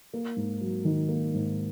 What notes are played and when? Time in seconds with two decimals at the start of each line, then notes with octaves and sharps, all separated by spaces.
0.13 A#3
0.36 G#2
0.61 F#3
0.85 D#3
1.09 A#3
1.34 G#2